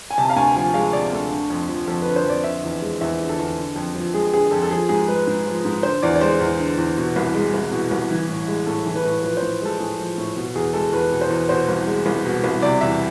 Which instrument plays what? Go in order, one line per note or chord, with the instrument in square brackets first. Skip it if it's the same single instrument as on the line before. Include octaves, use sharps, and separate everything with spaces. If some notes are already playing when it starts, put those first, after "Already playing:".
[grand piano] G#5
C3 A5
F5
D2 G#5
F3 G#5
G#3 F5
C3 D5
D2 A4
D3
F2
F3
F2 A4
D3 B4
C5
F2 D5
D3 E5
E2
G#3
E2 E5
D3
A4
E2
D3
F2
F3
G#3 G#4
D3 G#4
F2 A4
A4
F3 G#4
G#2 G#4
G#3 B4
G#2
F3
G#2
D3 C5
E2 D5
D5
G#3 C5
E2
D3
E2
B2
C2
G#3
C2
B2
C2
E3
A2
G#3
A2 A4
E3
B4
A2
F3 B4
C5
A2
G#3 A4
A2 G#4
F3
A2
B2
E2 G#4
G#3 A4
E2 B4
B2
C5
E2
B2 C5
C2
G#3
C2
B2
C2
C3 D5
E2 E5